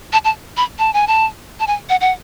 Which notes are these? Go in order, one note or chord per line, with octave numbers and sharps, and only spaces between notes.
A5
A5
B5
A5
G#5
A5
A5
G#5
F#5
F#5